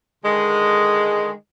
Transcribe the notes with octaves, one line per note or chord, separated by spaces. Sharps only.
D3 D#3 G#3